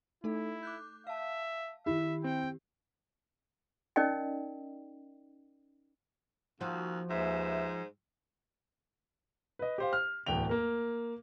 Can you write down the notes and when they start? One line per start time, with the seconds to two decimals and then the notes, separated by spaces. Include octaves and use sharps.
0.24 A3 D#4 E4 A4
0.63 D6 F#6 G6
1.07 E5 F5 A5
1.86 D#3 E4 G4 E5
2.24 C4 G5
3.96 C#4 D#4 A#4 D5 D#5 G5
6.61 D#2 F3 F4 F#4 F5
7.10 D#2 G#2 B4 C5 E5
9.59 B4 D#5
9.78 G4 C5 F5
9.93 F6
10.26 D1 E2 G5 F7
10.49 A#3 A#4